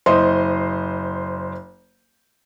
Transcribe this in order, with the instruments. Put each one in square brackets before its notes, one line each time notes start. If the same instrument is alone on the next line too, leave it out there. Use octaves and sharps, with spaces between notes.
[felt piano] F#1 C5 D#5 C6